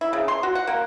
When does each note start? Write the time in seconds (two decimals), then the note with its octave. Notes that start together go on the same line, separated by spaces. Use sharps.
0.01 E4
0.13 C#3
0.28 C6
0.43 F#4
0.55 F#5
0.67 A#3